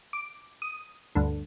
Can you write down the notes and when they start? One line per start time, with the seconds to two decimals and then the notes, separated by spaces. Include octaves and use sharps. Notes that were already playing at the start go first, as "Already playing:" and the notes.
0.13 D6
0.62 D#6
1.15 D2 G2 D3